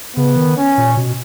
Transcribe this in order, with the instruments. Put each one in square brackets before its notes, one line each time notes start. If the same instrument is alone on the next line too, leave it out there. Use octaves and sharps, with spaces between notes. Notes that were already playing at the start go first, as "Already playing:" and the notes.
[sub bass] C#3 [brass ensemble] B3
[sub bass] D#3
[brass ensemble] C#4
[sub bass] A#2
B2